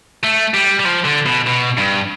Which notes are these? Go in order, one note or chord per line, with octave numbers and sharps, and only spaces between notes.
A3
G3
G3
F3
D3
B2
B2
G2